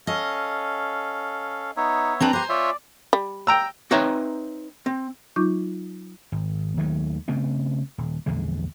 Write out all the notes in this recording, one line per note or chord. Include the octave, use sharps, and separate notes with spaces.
C#4 A4 D#5 F5
B3 D#4 C#5 E5
C4 D4 B4 A#5
G4 B4 C5 G#5 C6
F4 C#5 D5 E5
G3
G5 A#5 E6
C4 D#4 B4 C#5 E5 A#5
C4
F#3 D#4 F4 C#6 D6 G6
G#1
D#2 D#3 F#3 A3
C#3 A3 B3 C4
D#1
A#1 E2 D3 G#3